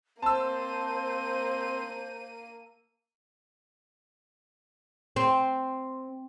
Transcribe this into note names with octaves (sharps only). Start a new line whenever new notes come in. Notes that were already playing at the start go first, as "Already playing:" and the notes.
A#3 C4 C5 A5 E6 D#7
C4